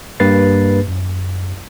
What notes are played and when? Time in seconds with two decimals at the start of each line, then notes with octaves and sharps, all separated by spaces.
0.20 G2 A#3 G4 B4 A6 C7
0.88 F#2